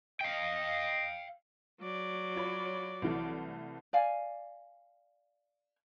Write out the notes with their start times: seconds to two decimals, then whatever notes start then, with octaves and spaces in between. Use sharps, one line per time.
0.21 D#5 F5 G5
1.80 F#3 D5
2.36 F4 C#5 B5
3.02 C2 E3 A3
3.93 D5 F5 G#5